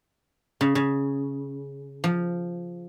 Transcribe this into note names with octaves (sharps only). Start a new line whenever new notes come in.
C#3
C#3
F3